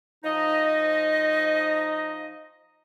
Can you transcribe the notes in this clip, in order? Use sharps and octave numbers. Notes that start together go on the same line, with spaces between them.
F3 D#4 D#5